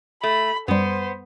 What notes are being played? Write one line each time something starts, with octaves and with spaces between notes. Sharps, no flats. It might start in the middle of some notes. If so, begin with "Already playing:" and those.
A3 B5
F#2 G3 B3 C5